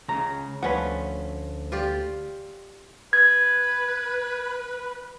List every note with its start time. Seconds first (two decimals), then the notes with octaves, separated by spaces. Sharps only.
0.08 C#2 C#3 A#5
0.63 D2 F3 C#4 B4 F#5
1.72 F4 G4 D5
3.13 B4 G#6